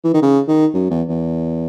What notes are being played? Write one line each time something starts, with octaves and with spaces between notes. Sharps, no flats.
E3
D#3
C#3
D#3
F#2
E2
E2